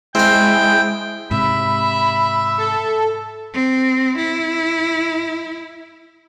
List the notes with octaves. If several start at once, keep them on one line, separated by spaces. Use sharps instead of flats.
G#3 C4 E4 F5 G5
G#2 C3 E5 B5
A4
C4
E4